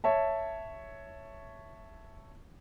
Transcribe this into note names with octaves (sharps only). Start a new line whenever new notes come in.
C#5 E5 A5